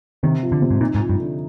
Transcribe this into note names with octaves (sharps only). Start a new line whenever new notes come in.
C3 D#3
F3
D3
C3
G#2
A#2 D#4
G#2
F3
G2
D3